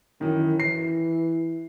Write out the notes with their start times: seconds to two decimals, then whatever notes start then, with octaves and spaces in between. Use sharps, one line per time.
0.21 F#2 D#3 E3
0.60 E3 C7